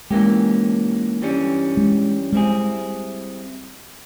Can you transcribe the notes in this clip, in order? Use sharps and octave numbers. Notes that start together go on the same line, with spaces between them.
G#2 E3 G#3 A#3 C#4 G4
G2 E3 G3 C#4
G#3
G3 G#3 C4 E4 G#4